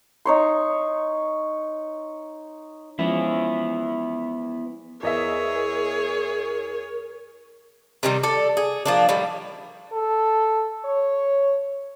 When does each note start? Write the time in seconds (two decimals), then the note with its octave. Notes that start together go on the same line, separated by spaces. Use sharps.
0.25 D#4 C#5 C6
2.99 F3 G#3 B3 C#4 E4
5.03 E2 G#4 A#4 C#5 D#5 E5
8.03 C3 D#3 G3
8.23 A4 D5
8.57 G#4
8.85 F3 A#3 D4
9.09 A2 D#3 G3
9.93 A4
10.85 C#5